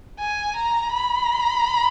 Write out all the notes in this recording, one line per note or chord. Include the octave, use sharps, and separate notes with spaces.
G#5
A#5
B5